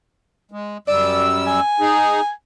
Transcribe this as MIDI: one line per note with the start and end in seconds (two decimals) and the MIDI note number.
0.51 0.77 56
0.88 1.60 42
0.88 1.60 55
0.88 1.26 74
0.88 1.60 88
1.47 2.30 80
1.80 2.21 63
1.80 2.21 68